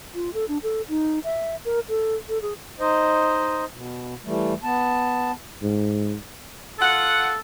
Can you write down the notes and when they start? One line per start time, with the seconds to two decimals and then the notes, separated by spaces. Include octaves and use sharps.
0.15 F4
0.34 A4
0.48 D4
0.63 A4
0.89 D#4
1.24 E5
1.65 A#4
1.89 A4
2.29 A4
2.42 G#4
2.80 D#4 C5 D#5
3.74 B2
4.25 E3 G3 A3
4.63 B3 A5
5.63 G#2
6.79 F4 A4 F#5